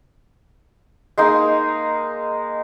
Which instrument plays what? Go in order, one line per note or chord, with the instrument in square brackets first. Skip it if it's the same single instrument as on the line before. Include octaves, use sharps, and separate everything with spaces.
[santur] G#3 A#3 D#4